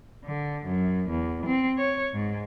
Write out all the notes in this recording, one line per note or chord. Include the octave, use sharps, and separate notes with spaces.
D3
F#2
E2
C4
C#5
G#2